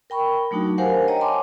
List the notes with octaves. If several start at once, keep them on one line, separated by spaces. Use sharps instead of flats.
A#4 G5 B5 C#6
F#3 A3 D4 D#4 F#4
G4 A#4 C5 F5 F#5 G#5
C#5 D#5 F#5 G5 A#5
G#5 A5 C6 D6